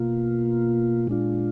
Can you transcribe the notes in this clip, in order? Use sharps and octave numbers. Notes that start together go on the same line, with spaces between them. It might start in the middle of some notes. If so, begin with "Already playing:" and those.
Already playing: B2 A#3 F4
A#2 G#3 D4 F4